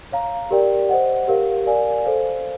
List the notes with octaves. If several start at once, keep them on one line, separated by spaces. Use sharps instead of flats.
C#5 F5 A#5
G4 A#4 D5 G5
C5 D#5 F#5
G4 A#4 C#5 F5
A#4 D5 F5 G#5
A4 C5 F5